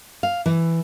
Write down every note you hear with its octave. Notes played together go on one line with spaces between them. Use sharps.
F5
E3